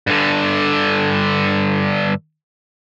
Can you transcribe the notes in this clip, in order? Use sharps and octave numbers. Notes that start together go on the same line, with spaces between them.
G2 D3